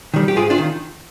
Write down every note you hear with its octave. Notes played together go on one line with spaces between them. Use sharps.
D#3 G3
G4
G#2 F4 G#4
D4 F4
D#3